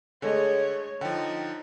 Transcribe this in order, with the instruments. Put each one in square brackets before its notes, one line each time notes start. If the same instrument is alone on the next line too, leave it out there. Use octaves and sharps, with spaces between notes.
[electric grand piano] D3 [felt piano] G#3 A3 D#5 [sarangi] C#5
[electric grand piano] D3 F3 [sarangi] D#4 [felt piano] G5